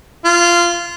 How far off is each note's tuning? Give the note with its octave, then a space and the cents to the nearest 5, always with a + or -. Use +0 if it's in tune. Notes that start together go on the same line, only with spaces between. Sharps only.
F4 -15